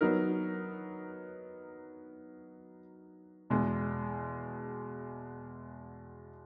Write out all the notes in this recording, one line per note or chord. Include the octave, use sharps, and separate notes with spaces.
F#3 B3 D#4 A#4
E2 B2 G#3